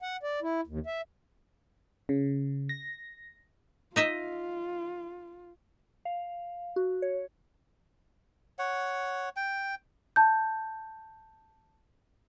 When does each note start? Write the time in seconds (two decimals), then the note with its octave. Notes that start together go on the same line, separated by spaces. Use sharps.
0.02 F#5
0.23 D5
0.42 E4
0.67 D#2
0.86 E5
2.09 C#3
2.69 A#6
3.96 D#4 F4 D#5 E5
6.05 F5
6.76 F#4
7.02 C#5
8.59 C#5 F#5
9.36 G5
10.16 A5 G6